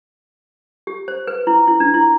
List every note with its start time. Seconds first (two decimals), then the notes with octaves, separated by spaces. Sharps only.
0.87 G4
1.08 C5
1.27 B4
1.47 E4
1.67 E4
1.80 D4
1.94 E4